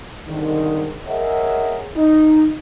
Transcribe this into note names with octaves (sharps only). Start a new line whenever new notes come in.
C2 G#2 D3 D#3
G#4 A#4 C#5 D#5 E5 F#5
D#4